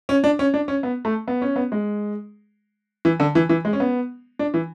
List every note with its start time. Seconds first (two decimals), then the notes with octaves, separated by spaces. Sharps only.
0.09 C#4
0.24 D4
0.39 C#4
0.54 D4
0.68 C#4
0.83 B3
1.05 A3
1.28 B3
1.42 C#4
1.56 B3
1.72 G#3
3.05 E3
3.20 D3
3.35 E3
3.49 E3
3.65 G#3
3.73 C#4
3.80 B3
4.39 D4
4.54 E3